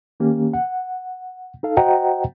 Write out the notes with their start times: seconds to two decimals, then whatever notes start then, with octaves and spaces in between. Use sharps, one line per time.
0.20 D#3 A#3 C#4 G4
0.53 F#5
1.63 D#4 A4 F5
1.77 F#4 C5 D#5 F#5 G5 A#5